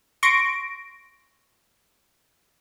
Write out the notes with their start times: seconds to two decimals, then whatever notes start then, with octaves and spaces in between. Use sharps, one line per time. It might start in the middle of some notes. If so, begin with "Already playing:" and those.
0.23 C6 C#6 A#6 D7